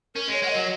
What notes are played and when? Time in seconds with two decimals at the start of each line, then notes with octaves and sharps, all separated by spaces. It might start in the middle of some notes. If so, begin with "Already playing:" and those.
0.15 C#4 A#4
0.28 G#3 C#5
0.42 G#3 F#5
0.50 F#3 D#5